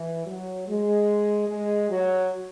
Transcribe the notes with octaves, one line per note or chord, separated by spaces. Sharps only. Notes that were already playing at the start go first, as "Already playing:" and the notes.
Already playing: E3
F#3
G#3
G#3
F#3